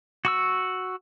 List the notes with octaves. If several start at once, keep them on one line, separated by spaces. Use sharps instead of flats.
F#4 C#6 E6